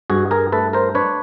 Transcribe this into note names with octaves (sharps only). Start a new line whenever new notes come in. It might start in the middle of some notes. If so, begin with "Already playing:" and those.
G2 F#4 G#4
G#4 A#4
A3 A4 B4
A#4 C5
D4 B4 C#5